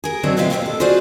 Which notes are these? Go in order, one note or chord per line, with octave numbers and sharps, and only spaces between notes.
G#4 A#4
D3 F#3 C4 D#4
B2 G#3 C4 F4 E5 F5
C3 D#3 E3 G3 G#3 C4
A2 A4
F4 F#4 G#4 C5 D5 F5